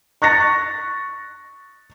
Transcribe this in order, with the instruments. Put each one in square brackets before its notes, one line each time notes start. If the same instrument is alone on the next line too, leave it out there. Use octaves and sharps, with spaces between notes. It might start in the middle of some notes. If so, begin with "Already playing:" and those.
[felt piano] C#6 F#6 A6 A#6 C#7